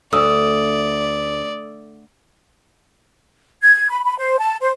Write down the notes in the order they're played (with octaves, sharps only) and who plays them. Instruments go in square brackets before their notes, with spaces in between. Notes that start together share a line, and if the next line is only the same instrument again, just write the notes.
[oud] D2 [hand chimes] A4 D#6 E6 [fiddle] D5
[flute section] G#6
B5
B5
C5
A5
C5